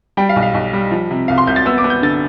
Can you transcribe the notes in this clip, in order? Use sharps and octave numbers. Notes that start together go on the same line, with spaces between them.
G3 G5
F5
B1
F5
B1
G3
F3
C3
C2 F5
C6
C2 G6
A6
B3 E6
D6
B3
G6
D3 A6